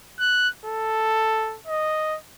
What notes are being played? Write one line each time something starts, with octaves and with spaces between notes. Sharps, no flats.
F#6
A4
D#5